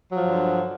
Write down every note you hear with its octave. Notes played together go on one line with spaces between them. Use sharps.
G2 D3 F3 F#3